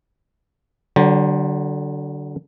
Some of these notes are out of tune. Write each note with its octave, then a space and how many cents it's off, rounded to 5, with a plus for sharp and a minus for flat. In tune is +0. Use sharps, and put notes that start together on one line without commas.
D3 +0 F#3 +45 C5 +25